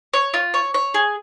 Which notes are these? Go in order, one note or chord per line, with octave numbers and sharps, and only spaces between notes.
C#5
F4
C#5
C#5
G#4